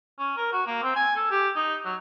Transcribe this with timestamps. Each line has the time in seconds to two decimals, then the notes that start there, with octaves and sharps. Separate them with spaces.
0.19 C#4
0.37 A#4
0.53 F#4
0.67 A#3
0.83 C4
0.96 G#5
1.16 A4
1.31 G4
1.56 D#4
1.85 F#3